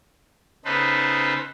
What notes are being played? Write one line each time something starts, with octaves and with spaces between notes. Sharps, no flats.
C#3 B3 D#4 A4 B4 C5